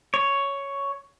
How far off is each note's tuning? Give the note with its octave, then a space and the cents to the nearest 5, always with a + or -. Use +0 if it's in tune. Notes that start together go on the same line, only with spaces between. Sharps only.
C#5 +5